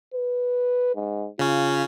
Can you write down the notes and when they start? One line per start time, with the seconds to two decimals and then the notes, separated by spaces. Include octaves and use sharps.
0.14 B4
0.95 G#2
1.39 C#3 C#4 F4